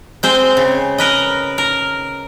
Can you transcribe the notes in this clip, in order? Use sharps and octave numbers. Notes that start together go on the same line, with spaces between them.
G#3 C4 C5
C#3
A#4 B4 D#5
A#4